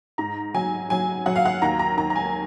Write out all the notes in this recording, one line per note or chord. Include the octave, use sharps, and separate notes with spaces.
G#2 A#5
F#3 G#5
F#3 G#5
F#3 F#5
F5
F#5
D#2 A#5
A#5
D#2 A#5
A#5
G#5